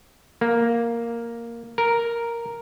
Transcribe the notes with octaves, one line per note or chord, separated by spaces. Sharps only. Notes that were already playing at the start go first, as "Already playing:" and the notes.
A#3
A#4